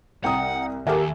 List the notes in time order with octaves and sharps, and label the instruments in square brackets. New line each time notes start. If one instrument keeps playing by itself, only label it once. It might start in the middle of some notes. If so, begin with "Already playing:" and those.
[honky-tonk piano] C2 [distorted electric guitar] F#5 [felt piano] G5 A#5 D#6
[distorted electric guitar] D#2 [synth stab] G4 A#4 F#5 [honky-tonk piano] A4 E5 [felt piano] G#5